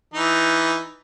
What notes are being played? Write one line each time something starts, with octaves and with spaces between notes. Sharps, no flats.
E3 D#4